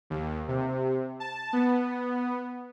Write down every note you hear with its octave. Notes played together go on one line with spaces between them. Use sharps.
D#2
C3
A5
B3